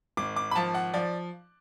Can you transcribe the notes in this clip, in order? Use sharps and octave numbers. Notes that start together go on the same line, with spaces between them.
G#1 D6
D6
B5
F3 A5
F#5
F3 D5